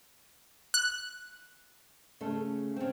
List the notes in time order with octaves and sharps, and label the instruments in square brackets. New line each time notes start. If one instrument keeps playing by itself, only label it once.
[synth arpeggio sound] F#6
[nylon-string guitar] C#3 A3 A4
C#3 C4